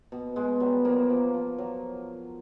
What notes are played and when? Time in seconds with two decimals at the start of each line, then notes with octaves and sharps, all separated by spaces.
0.12 B2
0.36 B2 G#3
0.60 F#3 G3
0.85 F3 A#3
1.10 F3
1.34 F3
1.58 F#3